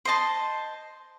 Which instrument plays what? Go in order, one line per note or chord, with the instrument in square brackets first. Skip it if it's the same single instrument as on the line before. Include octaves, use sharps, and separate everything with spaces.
[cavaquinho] C5 D#5 A5 C6